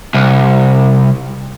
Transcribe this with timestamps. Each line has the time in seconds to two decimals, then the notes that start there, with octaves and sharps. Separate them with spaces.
0.14 C2